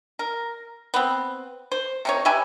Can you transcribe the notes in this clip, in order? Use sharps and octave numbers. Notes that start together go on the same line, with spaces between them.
A#4
B3 C4
C5
C3 D#4 C#5
G4 B4 E5 G#5